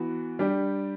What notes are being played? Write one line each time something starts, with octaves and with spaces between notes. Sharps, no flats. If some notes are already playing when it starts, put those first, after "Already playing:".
Already playing: E3 B3 F#4
G3 D4 G4